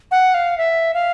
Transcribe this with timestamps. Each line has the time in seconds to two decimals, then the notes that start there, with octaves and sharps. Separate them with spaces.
0.11 F#5
0.34 F5
0.58 E5
0.94 F5